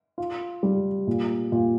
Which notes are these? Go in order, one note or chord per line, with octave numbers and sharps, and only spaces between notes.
F4
G3
A#2
A#2